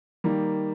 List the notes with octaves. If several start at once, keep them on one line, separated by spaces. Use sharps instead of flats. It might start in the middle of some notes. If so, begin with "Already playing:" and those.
D#3 G3 A#3